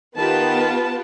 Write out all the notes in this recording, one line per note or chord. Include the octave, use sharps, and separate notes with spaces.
D#3 B3 F4 G4 B4 A5